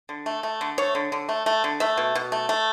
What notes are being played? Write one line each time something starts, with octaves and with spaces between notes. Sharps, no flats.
D3
A3
A3
D3
A3 C#5
D3
D3
A3
A3
D3
A3 E5
B2
B2
A3
A3